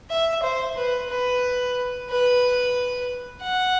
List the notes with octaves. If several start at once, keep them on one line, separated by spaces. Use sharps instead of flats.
E5
C5
B4
B4
B4
F#5